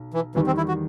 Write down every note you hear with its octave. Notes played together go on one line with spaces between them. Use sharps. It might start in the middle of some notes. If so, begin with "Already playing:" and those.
Already playing: B1
E3
E2 D#3 E3 G3
C4
E4
F#4